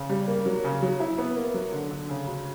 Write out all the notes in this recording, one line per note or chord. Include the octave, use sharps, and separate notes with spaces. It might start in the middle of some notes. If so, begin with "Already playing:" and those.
Already playing: C#3
G3
A#3
F#3
C#3
F#3
E4
B3
A#3
F#3
D3
D3
C#3
D2